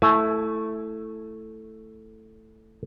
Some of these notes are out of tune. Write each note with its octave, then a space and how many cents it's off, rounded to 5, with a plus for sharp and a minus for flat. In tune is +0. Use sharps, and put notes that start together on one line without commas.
A3 +0 E4 +0 G#5 +40